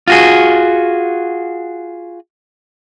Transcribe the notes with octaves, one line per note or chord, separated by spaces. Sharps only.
F4 F#4 G#4